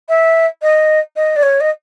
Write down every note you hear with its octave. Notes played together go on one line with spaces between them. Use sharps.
E5
D#5
D#5
D5
C#5
D#5